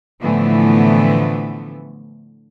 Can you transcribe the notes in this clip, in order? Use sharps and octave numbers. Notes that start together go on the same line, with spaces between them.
A2 D3 E3 F3 A3 B3